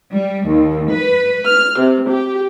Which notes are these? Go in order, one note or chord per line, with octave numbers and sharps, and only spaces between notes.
G3
D#2
B4
F6
C3
G4